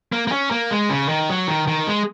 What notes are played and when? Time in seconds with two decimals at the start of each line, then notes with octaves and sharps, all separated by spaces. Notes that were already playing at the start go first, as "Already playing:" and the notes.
0.13 A#3
0.27 A#3
0.32 C#4
0.51 A#3
0.71 G#3
0.90 C#3
1.09 D#3
1.29 F#3
1.47 D#3
1.68 D#3
1.87 G#3